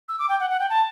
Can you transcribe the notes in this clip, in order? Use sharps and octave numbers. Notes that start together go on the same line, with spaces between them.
E6
D6
G5
F#5
F#5
G5
A5